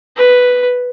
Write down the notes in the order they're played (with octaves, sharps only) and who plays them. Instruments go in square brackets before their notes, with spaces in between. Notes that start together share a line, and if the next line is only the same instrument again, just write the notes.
[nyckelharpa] B4